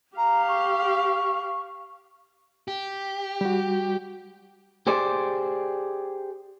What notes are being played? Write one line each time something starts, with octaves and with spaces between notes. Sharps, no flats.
G4 F5 A#5
C#6
G4
G3 F#4
G4 G#4 C5 D5